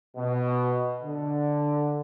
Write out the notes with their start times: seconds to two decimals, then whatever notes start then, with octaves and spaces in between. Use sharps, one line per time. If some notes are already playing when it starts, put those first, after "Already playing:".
0.17 B2
1.03 D3